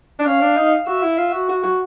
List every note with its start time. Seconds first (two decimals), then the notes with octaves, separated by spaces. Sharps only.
0.19 D4
0.26 C#4 F5
0.41 D4
0.57 D#4
0.87 F#4 E5
1.02 E4
1.18 F4
1.33 F#4
1.49 F#4
1.63 F#4